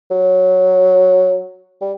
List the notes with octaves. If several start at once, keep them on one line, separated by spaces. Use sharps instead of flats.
F#3
G3